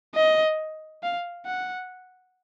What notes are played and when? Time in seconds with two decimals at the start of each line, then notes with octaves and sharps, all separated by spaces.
0.15 D#5
1.03 F5
1.46 F#5